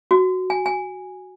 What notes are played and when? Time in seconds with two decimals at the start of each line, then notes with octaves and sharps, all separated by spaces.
0.11 F#4
0.50 G#5
0.66 G#5